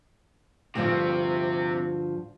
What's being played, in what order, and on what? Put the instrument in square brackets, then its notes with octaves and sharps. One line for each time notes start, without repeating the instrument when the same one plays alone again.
[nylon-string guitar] D2 G2 F3 [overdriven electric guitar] C3 C4